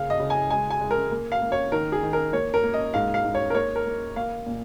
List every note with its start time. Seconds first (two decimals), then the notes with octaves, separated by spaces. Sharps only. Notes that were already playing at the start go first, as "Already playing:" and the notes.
Already playing: C#3 A#3 F5
0.10 D#5
0.20 C#3
0.30 G#5
0.50 G#3 G#5
0.70 G#5
0.81 G#3
0.91 A#4
1.11 A#3
1.32 F5
1.42 A#3
1.52 C#5
1.72 D#3 A#4
1.92 G#4
2.03 D#3
2.13 A#4
2.33 A#3 C#5
2.54 A#4
2.64 A#3
2.74 D#5
2.94 G#2 F5
3.14 F5
3.25 G#2
3.35 C#5
3.50 A#4
3.55 A#3 C#5
3.76 A#4
3.86 A#3
4.16 A#3 F5
4.46 A#2